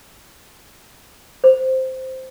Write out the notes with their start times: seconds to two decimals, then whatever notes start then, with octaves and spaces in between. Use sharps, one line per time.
1.44 C5